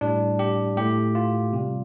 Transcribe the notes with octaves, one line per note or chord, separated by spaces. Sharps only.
A2 G3 D4
G4
A2 A3 G4
F4
C3 G3